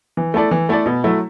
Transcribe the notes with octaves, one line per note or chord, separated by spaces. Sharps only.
E3
A3 E4 A4 D5
E3
A3 E4 A4 D5
B2
F#3 A3 E4